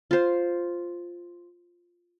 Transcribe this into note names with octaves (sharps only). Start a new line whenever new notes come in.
F4 C5